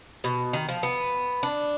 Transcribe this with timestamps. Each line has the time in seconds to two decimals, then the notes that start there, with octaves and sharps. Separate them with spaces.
0.24 B2
0.53 D#3
0.69 F3
0.83 B3
1.43 D4